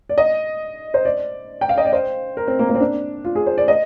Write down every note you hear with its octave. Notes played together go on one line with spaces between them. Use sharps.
D5
D#5
C5
D5
G5
F5
D#5
D5
C5
A#4
C4
A#3
A#3
C4
D4
F4
G#4
C5
D5
D#5